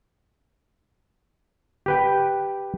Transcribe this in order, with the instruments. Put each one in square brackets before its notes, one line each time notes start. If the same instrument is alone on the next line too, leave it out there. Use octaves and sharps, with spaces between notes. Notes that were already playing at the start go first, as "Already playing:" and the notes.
[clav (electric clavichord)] G4 B4 G5